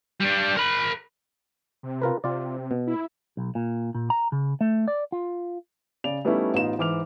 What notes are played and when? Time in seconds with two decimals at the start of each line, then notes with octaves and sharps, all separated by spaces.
0.21 G3 D4
0.57 A#4 B5
1.83 C3
2.02 F4 A#4 B4
2.24 C3 F4 D5
2.71 B2
2.87 E4
3.37 B1
3.55 A#2
3.94 A#2
4.10 A#5
4.32 C#3
4.61 A3
4.88 D5
5.12 F4
6.04 C#3 D5 F7
6.25 G3 A3 B3 C#4 D#4 E4
6.54 A1 B3 D#4 F4 E7
6.78 G#2 E3 D6 F6 F7